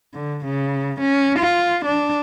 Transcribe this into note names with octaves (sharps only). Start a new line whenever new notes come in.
D3
C#3
C#4
F4
D4